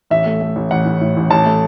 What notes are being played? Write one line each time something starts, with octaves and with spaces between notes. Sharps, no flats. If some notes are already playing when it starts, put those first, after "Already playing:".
A1 E5
A3
A3
A1
A1 F#5
A2
A2
A1
A1 A5
A3